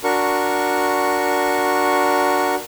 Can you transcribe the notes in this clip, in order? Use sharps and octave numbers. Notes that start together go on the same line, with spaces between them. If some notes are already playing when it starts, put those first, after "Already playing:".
D4 F#4 A#4 C#6